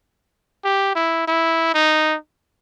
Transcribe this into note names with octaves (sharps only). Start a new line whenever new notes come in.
G4
E4
E4
D#4